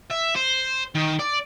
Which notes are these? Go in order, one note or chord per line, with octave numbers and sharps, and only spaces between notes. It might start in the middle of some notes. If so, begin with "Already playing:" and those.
E5
C5
D#3
D5